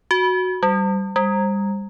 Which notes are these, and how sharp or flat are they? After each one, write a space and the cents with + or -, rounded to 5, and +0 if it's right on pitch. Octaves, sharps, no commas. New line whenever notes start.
F#4 -5
G3 -15
G3 +30